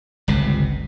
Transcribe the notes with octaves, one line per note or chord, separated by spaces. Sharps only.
G1 C#2 C3